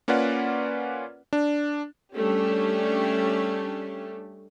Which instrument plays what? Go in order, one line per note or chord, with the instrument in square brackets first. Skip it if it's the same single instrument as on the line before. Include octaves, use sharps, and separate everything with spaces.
[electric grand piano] A#3 C#4 F4 B4 D5 F#5
D4
[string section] G3 A3 C#4 D4 G4